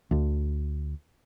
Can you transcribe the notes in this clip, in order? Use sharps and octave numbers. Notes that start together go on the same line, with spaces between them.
D2 D3